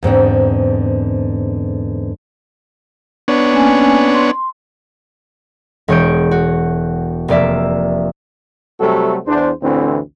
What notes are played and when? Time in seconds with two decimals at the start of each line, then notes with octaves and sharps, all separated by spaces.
0.03 E2 G#2 D3 C4
3.28 B3 D4 C#5
3.54 A#3 C#4 G#5
4.14 C6
5.88 E1 G#3 C#5 C#6 G6 D7
6.31 F#4
7.28 F1 A#3 D5 E5
8.79 C3 F#3 G3 A3 F#4 A4
9.26 E2 D4 C5
9.62 A1 D2 D3 E3 C4